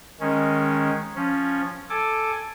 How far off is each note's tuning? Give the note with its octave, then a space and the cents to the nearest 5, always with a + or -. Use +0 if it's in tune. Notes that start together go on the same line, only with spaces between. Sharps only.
D#3 +0 G#3 +0 C#4 -10
F3 +0 C#4 -5
A4 +0 G#5 +0 D6 +10